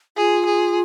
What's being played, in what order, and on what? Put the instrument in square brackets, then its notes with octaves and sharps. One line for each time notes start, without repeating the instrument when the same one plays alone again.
[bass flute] F4 [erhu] G#4
[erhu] G#4